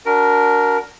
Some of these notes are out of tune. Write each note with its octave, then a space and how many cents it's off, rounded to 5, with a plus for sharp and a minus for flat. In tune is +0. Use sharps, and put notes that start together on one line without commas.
D4 -25 F#4 +0 A#4 +0